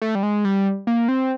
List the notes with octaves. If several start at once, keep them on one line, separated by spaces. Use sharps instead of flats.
A3
G3
G#3
G3
A#3
C4